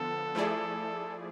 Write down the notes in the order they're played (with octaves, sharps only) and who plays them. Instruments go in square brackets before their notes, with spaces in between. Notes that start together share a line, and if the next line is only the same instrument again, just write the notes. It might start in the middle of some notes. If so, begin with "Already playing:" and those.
Already playing: [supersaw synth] D3 F3 B3 [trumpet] A4
[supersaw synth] F3 A3 E4 G#4 D5